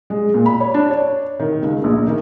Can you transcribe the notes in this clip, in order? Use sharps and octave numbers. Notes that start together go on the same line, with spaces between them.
G#3
A#2
B5
C#5
D4
C#5
D#3
C#2
A#1
D#3